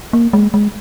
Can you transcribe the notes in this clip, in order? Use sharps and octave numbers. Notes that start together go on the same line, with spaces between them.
A#3
G#3
G#3